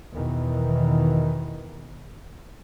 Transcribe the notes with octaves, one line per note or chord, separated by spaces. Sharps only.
E2 B2 D#3 E3